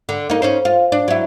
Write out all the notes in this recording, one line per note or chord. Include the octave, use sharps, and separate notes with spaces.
D3
A#3 D#4
C#4 D#4 C5
F4
D4
F#3 E4